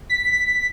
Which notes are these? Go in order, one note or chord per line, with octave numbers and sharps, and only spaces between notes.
B6